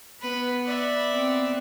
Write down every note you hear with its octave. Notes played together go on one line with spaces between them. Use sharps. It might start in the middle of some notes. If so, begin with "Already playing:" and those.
B3 B4
D5 E5
B3 C4